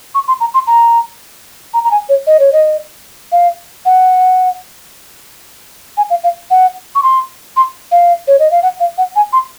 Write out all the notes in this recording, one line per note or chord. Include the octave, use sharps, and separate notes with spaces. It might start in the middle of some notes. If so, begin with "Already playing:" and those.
C#6
C6
A#5
C6
A#5
A#5
A#5
G#5
C#5
D#5
C#5
D#5
F5
F#5
G#5
F5
F5
F#5
C#6
C6
C6
F5
C#5
D#5
F5
F#5
F5
F#5
G#5
C6